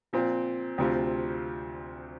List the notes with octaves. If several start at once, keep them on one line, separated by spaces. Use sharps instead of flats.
A#2 F3 C4
D2 C3 F3 C4 F4